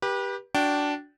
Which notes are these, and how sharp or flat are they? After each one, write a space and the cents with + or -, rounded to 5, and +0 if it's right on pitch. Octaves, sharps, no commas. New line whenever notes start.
G4 +10 B4 -30
D4 -10 F#4 +0 G5 -20